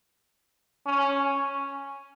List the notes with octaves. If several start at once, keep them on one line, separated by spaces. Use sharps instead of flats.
C#4